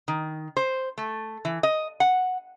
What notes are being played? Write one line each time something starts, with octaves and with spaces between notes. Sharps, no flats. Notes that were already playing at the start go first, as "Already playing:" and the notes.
D#3
C5
A3
E3
D#5
F#5